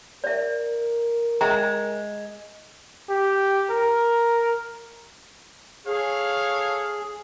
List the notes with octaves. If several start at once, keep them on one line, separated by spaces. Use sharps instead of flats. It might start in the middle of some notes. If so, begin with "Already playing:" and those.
A#4 D5 E5
G#3 E5 G5 A#5
G4
A#4
G#4 A4 C#5 F5